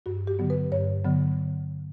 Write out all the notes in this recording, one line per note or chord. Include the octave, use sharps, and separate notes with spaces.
G2 F#4
G4
D3 F#3 B3
B4
G2 C#5
D3 F#3 B3